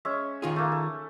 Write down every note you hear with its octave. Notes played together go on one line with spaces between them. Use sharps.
G#3 C#4 E5
D#3 F4 G#4 C#6
A3 A#3
A3